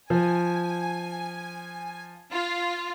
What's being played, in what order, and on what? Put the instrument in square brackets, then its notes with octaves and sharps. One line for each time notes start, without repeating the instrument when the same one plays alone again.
[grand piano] F3 [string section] G#5
[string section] F4